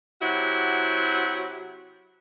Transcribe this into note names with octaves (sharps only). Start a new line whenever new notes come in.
C3 F#3 E4 F#4 F#5